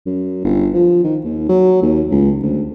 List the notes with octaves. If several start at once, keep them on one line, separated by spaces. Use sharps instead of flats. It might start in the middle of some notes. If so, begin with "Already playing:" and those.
F#2
G1
F3
D#3
D#2
F#3
D#2
C#2
D2